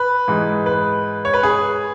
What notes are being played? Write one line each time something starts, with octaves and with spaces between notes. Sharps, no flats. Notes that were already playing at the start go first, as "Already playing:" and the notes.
Already playing: B4
G#2 E3 G#3
B4
C#5
B4
G#4